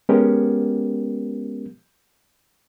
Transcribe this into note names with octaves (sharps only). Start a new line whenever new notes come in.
G#3 B3 C#4 G4 A#4